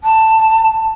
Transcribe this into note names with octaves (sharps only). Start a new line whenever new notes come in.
A5